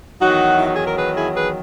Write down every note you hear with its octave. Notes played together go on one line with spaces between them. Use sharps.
E2 D#3 F#3 D#4 F#4
E4
F#4
G#4
A#4
G#4 B4
E4 G#4
G#4 B4